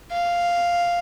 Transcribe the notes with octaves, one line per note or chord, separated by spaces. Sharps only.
F5